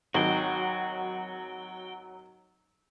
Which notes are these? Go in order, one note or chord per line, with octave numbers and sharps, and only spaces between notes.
G#1 F#3 F#4 G5